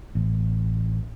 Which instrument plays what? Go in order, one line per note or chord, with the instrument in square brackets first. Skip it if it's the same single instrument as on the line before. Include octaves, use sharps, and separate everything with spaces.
[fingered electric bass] A1